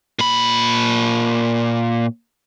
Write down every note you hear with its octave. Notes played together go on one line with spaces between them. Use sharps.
A#2 B5